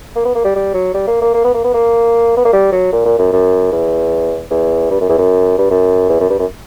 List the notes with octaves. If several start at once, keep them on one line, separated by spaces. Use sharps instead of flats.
A#3
B3
A#3
G3
G3
F#3
G3
A#3
A#3
A#3
B3
A#3
B3
A#3
B3
A#3
G3
F#3
A#2
A#2
F#2
F#2
E2
E2
G2
F#2
E2
F#2
G2
F#2
E2
F#2
G2
F#2